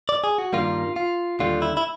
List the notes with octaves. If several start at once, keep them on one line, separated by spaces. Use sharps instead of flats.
D5
G#4
F#4
G2 D#3 G3 A#3 F4
F4
D#2 D3 G3 F4
E4
E4